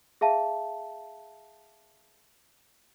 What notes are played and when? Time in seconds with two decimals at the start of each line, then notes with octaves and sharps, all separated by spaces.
0.21 G#4 E5 F5 A5